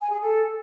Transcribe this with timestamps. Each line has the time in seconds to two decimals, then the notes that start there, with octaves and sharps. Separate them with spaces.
0.01 G#5
0.11 G#4
0.21 A4